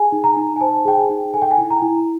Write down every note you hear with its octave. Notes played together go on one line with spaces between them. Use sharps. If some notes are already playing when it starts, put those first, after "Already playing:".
Already playing: G#4 G#5
D#4
A#5
D#4
G#5
C5 A5
G#4 G5
G#5
D#4
A4 G#5
G5
G#5
E4
A#5
E4